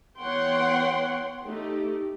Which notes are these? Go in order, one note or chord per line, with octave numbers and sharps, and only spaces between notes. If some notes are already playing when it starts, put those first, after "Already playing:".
E3 B3 C#5 F#5 G5 C6
A3 D#4 G4